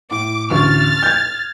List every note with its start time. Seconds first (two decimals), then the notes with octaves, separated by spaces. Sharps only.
0.11 A2 D6
0.50 A1 D2 C#6 F6 A6
1.03 G6 G#6